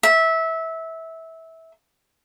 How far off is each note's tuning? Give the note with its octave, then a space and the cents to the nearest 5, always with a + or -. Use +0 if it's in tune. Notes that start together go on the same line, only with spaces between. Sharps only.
E5 -20